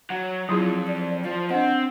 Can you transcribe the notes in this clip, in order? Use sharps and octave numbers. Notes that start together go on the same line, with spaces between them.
F#3 F#5
F2 F3 F#3 E4 F4 G#4
D5
F3 C5
C4 D4 D#5 F#5